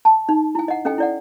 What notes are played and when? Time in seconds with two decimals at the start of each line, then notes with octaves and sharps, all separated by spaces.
0.05 A5
0.29 D#4
0.55 E4 G#5
0.68 D#5 F#5
0.85 C#4 A4 D#5 G5 G#5
0.98 E4 D5 F#5